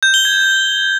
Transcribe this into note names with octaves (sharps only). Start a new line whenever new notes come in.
G6
G7
G#6